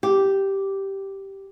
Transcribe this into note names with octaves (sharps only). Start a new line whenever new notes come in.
G4